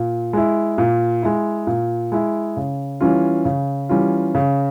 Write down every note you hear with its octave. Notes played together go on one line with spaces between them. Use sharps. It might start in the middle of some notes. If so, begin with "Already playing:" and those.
Already playing: A#2
G#3 E4
A#2
G#3 E4
A#2
G#3 E4
C#3
E3 G3 C#4 F4
C#3
E3 G3 C#4 F4
C#3